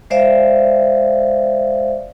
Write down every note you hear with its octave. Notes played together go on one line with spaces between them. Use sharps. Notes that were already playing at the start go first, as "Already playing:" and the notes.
G#3 C5 D5 E5 F5